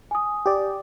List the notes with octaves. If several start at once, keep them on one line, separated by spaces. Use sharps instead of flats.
G#5 D#6
G4 D5